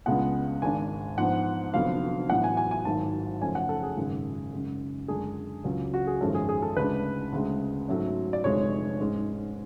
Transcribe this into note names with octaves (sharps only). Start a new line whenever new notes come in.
C#2 C#3 G#3 B3 D4 F#5
G#1 G#2 G#3 D4 G#5
G#2 F3 B3 D4 F#5
F1 F2 D3 F#3 B3 F5
A1 A2 F#3 B3 D4 F#5
G#5
G#5
G#5
G#1 G#2 F#3 A5
F#2 C#3 F3 A3 C#4 G#5
F#5
A4
G#4
G#1 F#2 C#3 G#3
F#2 C#3 G#3
F#2 D3 G#3 D4 G#4
C#2 C#3 F#3 C#4
F#4
G#4
G#1 F#2 F3 G#3 C#4 A4
G#4
G#4
A4
D2 C#3 G#3 D4 B4
D2 C#3 G#3
G#2 F#3 A3 C#4
D5
F1 F2 D3 G#3 C#5
G#2 G#3 C#4